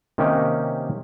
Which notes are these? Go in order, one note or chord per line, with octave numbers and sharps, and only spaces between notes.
C3 D#3 A#3 C#4 D#4 G4